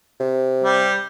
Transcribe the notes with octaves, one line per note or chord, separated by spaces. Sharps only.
C3
G3